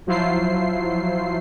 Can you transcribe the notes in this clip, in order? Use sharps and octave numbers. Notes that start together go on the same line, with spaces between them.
F3 F#3 E4 F4 C5 C7